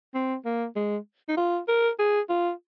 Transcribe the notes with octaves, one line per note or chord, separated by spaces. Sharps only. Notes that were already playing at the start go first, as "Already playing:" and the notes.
C4
A#3
G#3
D#4
F4
A#4
G#4
F4